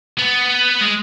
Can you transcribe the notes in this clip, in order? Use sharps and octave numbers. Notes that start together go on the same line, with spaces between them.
B3
G#3